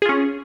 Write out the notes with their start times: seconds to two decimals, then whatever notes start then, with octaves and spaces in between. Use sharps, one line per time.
0.02 G#4
0.05 F4
0.09 C#4